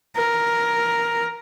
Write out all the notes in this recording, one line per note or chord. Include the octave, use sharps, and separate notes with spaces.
A#4